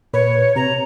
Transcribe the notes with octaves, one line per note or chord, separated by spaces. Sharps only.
A#2 B4 C#5
C3 A#5